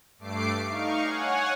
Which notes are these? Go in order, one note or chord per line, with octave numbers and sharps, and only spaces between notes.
G2 A3 D6 C7 D7
D#4 F5 C#6
C#5 F#5 G#5